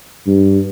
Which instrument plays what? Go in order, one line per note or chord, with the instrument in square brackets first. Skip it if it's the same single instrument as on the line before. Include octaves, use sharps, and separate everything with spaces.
[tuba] G2